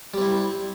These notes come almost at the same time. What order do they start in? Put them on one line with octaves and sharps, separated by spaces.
G3 C4 E4